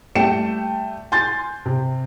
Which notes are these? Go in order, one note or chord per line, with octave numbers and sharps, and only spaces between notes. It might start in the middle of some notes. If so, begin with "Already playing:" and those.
G3 A3 G5 C#7 E7
G#5 C6 G6 A6
C3